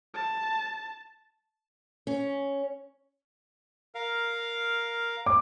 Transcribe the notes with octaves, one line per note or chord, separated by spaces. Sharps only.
A5
C#4
A#4 F5
D6